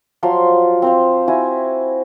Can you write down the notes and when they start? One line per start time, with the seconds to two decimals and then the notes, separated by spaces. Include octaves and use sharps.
0.23 F3 F#3 F5 C6
0.82 C4 C5 F5
1.28 E4 F#4 G#5